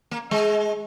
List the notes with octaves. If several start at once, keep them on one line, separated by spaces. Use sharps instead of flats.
A#3
G#3